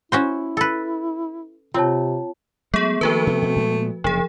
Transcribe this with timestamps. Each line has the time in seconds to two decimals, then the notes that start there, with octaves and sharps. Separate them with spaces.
0.12 C#4 E4 F#4 C5
0.57 A4 B4
1.74 C3 C4 F4 C#5 A5
2.74 F#3 G#3 A3 B3 G#4
3.01 D#3 F3 A3 A#3 F#4 B4
3.27 C3 B3
3.42 B2 C4
3.56 A#2 G#3 B3
4.04 F#1 C3 F3 G#4